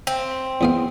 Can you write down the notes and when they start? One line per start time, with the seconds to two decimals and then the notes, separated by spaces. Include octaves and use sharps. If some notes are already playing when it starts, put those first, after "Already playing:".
0.07 C4
0.61 E2 B3 F5